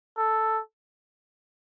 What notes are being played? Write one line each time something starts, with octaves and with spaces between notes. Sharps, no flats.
A4